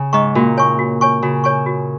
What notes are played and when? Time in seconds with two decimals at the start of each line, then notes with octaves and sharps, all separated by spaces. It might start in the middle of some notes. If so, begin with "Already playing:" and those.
Already playing: C#3
0.13 G#2 D#5 A#5 C#6
0.35 A#2 F#4
0.57 C#5 G#5 C#6
0.79 F#4
1.01 C#5 G#5 C#6
1.22 C#3 F#4
1.44 C#5 G#5 C#6
1.66 F#4